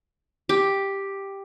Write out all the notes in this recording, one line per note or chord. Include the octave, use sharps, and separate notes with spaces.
G4